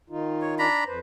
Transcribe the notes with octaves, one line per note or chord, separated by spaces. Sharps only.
D#3 D#4 F4
C#5
D4 A#5 B5
F2 B4 C5